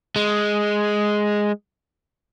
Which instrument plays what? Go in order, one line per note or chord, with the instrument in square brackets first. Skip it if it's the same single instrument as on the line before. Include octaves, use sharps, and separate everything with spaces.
[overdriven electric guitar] G#3